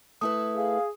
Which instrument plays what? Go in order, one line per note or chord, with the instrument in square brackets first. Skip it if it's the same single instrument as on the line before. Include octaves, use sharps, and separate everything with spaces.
[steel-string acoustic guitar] A3 E4 B4 [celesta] D#6
[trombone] G#4 [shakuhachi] F5